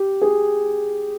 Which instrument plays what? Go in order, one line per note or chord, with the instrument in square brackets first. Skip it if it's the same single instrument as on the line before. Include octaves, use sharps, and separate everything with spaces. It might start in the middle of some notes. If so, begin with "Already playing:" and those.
Already playing: [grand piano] G4
G#4